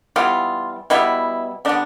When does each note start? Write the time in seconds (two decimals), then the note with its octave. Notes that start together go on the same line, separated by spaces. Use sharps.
0.16 E3 G3 B3 F4
0.90 B2 G3 B3 E4
1.65 D3 G3 B3 D4